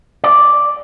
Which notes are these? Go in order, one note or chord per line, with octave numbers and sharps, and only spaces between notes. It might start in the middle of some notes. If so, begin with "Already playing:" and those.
D5